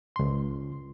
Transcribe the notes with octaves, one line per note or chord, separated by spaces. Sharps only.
C#2 C6